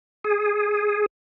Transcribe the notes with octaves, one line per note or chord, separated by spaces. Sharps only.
G#4